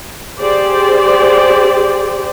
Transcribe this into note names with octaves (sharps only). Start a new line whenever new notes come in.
G4 G#4 C5 D5